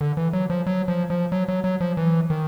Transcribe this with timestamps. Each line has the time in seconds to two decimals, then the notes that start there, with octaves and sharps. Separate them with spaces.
0.01 D3
0.17 E3
0.33 F#3
0.50 F3
0.66 F#3
0.88 F3
1.10 F3
1.32 F#3
1.48 F#3
1.64 F#3
1.81 F3
1.97 E3
2.30 D#3